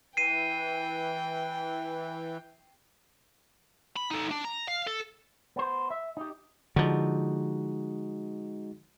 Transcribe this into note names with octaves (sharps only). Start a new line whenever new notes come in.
E3 G5 C7 D#7
B5
D#4 A4
D4
A#5
F5
A4
B3 C5
E5
D#4 G4
D3 F3 G#3 D#4 F#4